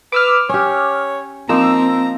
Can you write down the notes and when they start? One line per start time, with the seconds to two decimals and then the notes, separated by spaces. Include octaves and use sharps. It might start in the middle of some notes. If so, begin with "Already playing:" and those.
0.12 B4 D6 E6 F6
0.49 C#4 G4 C#5
1.49 F3 A#3 C4 D#4 A#5 E6